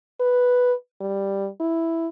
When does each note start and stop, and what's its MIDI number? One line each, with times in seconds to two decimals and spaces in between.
0.20 0.73 71
1.01 1.49 55
1.60 2.08 64